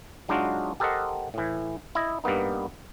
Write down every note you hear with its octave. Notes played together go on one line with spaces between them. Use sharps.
F#3 G#3 D4 D#4 F4 F#4
G4 A4 A#4 C5 D#5 F#5
A2 E3
E4 D#5
G2 G3 A#3 B3 D#4